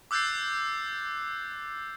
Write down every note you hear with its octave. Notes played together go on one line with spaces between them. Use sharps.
D6 E6 F#6 G6 A6 C7